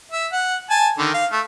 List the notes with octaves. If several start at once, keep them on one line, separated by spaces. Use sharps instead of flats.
E5
F#5
G#5 A5
D3 D#3
F5
A3